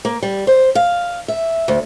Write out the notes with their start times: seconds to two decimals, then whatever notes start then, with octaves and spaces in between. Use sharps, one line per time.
0.05 A#3
0.23 G3
0.47 C5
0.75 F5
1.28 E5
1.68 D2